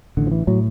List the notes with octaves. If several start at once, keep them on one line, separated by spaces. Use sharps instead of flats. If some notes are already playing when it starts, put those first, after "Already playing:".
A1 D3
F3
E3
A2 F#3